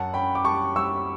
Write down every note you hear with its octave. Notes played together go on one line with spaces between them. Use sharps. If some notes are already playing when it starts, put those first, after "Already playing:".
Already playing: F#2 F#5 A5
C#4 G5 B5
D6
G3 A5 C#6
G3 C#6 E6